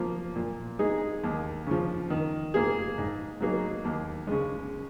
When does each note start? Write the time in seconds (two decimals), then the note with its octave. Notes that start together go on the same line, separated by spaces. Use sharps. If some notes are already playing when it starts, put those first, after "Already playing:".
Already playing: F3 A#3
0.36 A#2
0.79 G#3 D#4 G#4
1.24 D#2
1.66 C#3 F3
2.10 D#3
2.54 A#3 F4 G#4
2.98 G#2
3.40 F#3 A#3 D#4 G#4
3.85 D#2
4.27 C#3 G#3